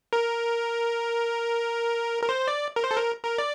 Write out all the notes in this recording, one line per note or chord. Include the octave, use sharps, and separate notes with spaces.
A#4
A#4
C5
D5
A#4
C5
A4
A#4
A#4
D5